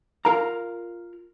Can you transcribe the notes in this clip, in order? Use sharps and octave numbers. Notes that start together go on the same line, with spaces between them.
F4 A#4 F5 A#5